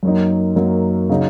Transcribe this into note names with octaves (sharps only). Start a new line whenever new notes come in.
F#2 F#3 A#3 D#4
F#2 F#3 A#3 D#4
C#3 F#3 D#4